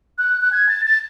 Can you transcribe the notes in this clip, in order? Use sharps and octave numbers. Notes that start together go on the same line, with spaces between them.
F#6
F#6
G#6
A6
A6